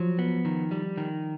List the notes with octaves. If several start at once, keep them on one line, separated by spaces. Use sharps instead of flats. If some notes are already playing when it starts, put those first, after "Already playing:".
Already playing: F3 F#3
B3
D#3
G3
D#3